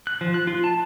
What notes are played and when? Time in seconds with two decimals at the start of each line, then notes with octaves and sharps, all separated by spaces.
0.07 F#6
0.21 F3
0.34 F#6
0.47 F4
0.64 A5